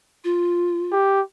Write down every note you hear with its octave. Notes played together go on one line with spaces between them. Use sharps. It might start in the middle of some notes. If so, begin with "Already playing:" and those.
F4
G4